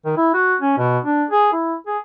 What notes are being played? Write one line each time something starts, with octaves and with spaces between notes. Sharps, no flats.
D#3
E4
F#4
C#4
B2
D4
G#4
E4
G#4